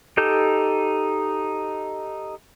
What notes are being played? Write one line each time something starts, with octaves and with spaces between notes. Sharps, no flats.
D#4 G4 A4 G6